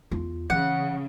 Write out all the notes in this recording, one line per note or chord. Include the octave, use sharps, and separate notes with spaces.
E2 F4
C#3 E3 F#5